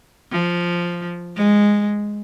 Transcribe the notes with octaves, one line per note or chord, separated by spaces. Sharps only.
F3
G#3